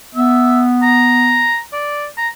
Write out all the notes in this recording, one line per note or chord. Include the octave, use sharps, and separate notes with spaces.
B3 E5
A#5
D5
A#5